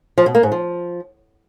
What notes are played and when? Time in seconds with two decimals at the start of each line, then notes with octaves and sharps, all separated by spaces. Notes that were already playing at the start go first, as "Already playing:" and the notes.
0.18 F3
0.26 B2
0.35 A#3
0.43 G#2
0.52 F3